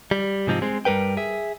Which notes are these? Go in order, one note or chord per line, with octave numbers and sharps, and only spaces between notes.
G3
G#2 C3 F3 C4 D#4
G#3 C4
G2 G3 A#4 B4 G5
G#4 E5